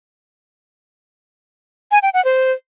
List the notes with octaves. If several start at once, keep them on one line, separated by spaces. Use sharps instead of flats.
G#5
G5
F#5
C5